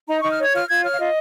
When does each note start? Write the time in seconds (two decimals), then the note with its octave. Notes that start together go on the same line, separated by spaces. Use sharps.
0.09 D#4 A#5
0.20 D#4 C#6
0.31 F6
0.39 C#5 G#6
0.53 F4 F6
0.69 F4 G#6
0.83 C#5 F6
0.93 F5
0.98 F4 D#5